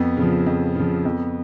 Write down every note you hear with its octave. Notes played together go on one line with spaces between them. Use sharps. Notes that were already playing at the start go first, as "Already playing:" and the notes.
Already playing: F2 B3
C#3 F3
F2
C#3 F3
F2 B3